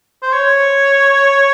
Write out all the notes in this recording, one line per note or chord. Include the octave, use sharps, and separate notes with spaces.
C5
C#5